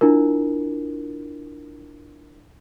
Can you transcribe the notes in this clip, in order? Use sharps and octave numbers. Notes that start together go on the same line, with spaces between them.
D4 E4 F4 A#4